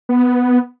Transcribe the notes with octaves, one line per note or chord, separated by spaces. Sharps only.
B3